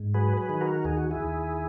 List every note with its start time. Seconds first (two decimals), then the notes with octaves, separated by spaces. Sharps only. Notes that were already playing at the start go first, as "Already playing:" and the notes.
Already playing: G#2
0.14 F#3 G#4 B4
0.37 G#4 B4
0.49 D#3
0.61 F#4 A#4
0.84 D#2 G#4
0.97 F#4
1.11 E4 G#4
1.20 D#2